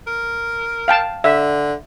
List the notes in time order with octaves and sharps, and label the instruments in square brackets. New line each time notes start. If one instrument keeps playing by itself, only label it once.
[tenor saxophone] A#4
[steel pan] F5 G5 A5
[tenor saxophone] D3 [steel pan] E5